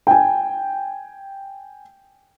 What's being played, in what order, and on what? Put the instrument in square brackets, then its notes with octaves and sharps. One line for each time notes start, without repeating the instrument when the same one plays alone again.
[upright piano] G5 G#5